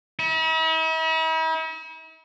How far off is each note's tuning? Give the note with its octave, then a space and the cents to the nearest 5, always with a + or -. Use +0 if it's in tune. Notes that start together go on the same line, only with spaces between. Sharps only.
E4 -45